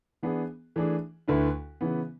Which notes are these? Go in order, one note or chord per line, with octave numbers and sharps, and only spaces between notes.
E3 B3 D4 G#4
E3 A3 D4 G#4
D2 D3 A3 E4 B4
C#3 E3 B3